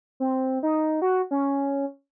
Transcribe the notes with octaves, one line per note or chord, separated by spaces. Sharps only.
C4
D#4
F#4
C#4